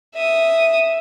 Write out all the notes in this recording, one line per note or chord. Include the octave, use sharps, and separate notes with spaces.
E5 D#6